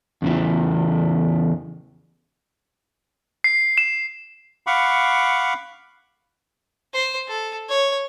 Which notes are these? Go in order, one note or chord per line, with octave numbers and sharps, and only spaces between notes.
E2 C#3 E3
C7
E7
F5 F#5 B5 C#6 D6
C5
A4
C#5